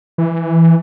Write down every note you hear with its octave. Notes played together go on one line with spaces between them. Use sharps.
E3